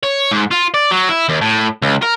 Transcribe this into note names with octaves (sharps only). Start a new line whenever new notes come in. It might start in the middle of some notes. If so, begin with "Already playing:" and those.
C#5
G#2
F4
D5
F#3
E4
D#2
A2
C#2
A#4